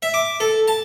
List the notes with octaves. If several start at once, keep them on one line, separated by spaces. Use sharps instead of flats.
E5
D6
A4
A5